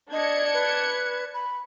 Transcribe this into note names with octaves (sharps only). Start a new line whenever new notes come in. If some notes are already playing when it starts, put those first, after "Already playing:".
D4 D#5 G#6 C#7
B4
B5